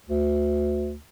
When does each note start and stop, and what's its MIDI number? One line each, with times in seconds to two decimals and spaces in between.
0.09 0.96 38